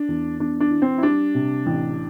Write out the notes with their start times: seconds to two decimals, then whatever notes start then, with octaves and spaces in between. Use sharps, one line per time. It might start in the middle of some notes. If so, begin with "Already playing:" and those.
Already playing: D4
0.08 E2
0.40 E2 D4
0.60 D4
0.71 E3
0.82 C4
0.98 E4
1.02 G3 D4
1.34 C3
1.66 A1